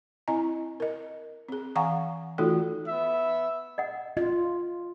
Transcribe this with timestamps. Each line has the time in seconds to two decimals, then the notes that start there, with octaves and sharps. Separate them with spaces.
0.28 C4 E4 D#5 G#5 A#5
0.80 A#4 D#5
1.49 C4 G#4
1.75 E3 F5 F#5 G#5 A#5 C#6
2.38 E3 A3 D#4 F4 F#4 A4
2.88 B3 E5
3.78 D#5 F#5
4.17 F4 D#5